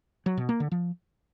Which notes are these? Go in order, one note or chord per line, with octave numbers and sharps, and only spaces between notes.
F#3
B2
A#3
D3
F3